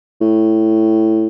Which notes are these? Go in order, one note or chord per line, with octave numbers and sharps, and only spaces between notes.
A2